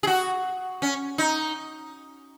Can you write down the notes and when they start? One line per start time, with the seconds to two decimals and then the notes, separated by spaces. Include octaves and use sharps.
0.03 G#4
0.07 F#4
0.82 C#4
1.18 D#4